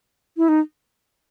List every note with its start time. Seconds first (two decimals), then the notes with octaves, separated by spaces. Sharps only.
0.37 E4
0.49 D#4